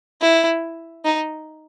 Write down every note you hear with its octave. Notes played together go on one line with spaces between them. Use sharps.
E4
D#4